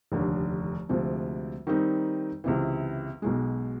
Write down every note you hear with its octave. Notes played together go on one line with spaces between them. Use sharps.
F1 D#2 D3
D2 C3 F3 G#3
D#3 G3 C4 D#4
C#2 C3 E3
B1 B2 G#3